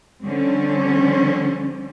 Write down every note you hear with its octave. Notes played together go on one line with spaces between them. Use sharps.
D3 F3 G3 C4 C#4